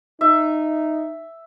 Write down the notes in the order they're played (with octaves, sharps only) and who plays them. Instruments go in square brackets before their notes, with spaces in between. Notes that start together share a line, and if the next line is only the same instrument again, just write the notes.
[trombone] D#4 [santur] E5